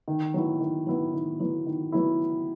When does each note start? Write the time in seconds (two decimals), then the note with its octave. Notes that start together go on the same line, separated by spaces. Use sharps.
0.08 D#3
0.34 F#3 B3 E4
0.60 D#3
0.87 F#3 B3 E4
1.13 D#3
1.39 F#3 B3 E4
1.66 D#3
1.92 F#3 B3 E4